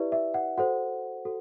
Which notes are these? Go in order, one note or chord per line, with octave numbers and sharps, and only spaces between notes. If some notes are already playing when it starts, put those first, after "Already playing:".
Already playing: E4 G4 B4 D5 E5
E5
F#5
F#4 A4 C5 F#5
F#4 A4